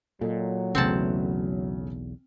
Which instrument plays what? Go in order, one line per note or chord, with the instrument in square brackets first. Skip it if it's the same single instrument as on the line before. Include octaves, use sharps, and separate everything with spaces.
[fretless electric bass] A#2 [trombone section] F#3 [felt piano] A4 D#5
[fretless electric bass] B1 E2 [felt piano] C#3 A3 [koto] C4 F#5 A5